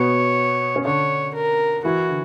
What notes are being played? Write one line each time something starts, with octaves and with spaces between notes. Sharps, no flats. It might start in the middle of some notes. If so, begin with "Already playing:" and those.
Already playing: B2 B3 C#5
C#4
D3 D4 C#5
A#4
E3 E4 F#4
D3